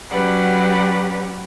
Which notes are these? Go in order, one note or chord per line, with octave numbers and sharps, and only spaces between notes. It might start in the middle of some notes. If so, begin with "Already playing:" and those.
F#3 C#4 G4 B4 D5 F#5